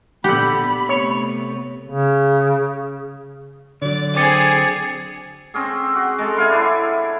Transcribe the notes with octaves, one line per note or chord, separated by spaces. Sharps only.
A#2 D3 B3 G4 F#5 B5
C3 A3 B3 C#5
C#3
D3 F#3 D5
C4 G#4 D6 A6 C#7
C4 C#4 G#4
F#4
G#3 A4
E4 F5 G#5
D4 E4 C#5